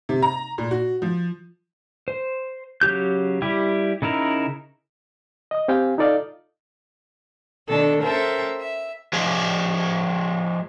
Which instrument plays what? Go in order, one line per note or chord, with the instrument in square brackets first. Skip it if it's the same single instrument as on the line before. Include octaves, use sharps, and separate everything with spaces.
[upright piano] C3
A#5
A#2
F#4
F3
[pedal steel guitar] C5
C#3 F#3 G4 G6
G3 E4 G4
C#3 D#4 E4 A#4
[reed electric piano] D#5 D#6
C4 G4 C5 F5 G5 G#5
D#4 F4 A4 D5 D#5 F5
[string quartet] B2 D#3 D4 A4
C#4 A4 A#4 C5 E5 G5
E5
[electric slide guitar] F3 G#3 G#4